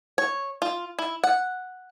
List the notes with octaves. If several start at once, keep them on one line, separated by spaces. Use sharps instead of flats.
C#5
F4
E4
F#5